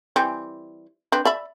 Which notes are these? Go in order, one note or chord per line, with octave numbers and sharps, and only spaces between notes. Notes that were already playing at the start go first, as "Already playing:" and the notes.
E3 G3 C4
C4 D4 B4
D5 E5 B5